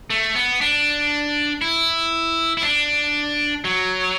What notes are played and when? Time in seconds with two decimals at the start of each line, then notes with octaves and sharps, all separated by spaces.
0.10 A3
0.35 B3
0.61 D4
1.61 E4
2.57 E4
2.63 D4
3.64 F#3